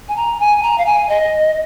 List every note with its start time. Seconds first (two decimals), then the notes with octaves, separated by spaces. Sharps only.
0.08 G#5
0.17 A#5
0.40 G#5
0.63 A#5
0.78 F5
0.86 G#5
1.09 D#5